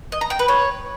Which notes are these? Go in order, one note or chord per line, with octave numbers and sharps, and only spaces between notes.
D#5
A#5
G5
B4
C#5